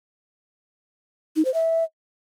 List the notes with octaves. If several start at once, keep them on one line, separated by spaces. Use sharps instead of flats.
D#4
C5
E5